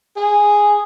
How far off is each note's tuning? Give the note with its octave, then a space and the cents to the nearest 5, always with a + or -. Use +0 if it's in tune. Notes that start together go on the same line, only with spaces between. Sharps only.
G#4 -5